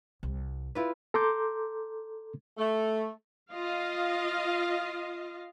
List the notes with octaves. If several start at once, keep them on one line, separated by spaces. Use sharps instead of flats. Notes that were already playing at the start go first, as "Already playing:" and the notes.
C2
E4 F4 B4
A4 A#5 C6 D6 G6
A3
F4 D#5 F5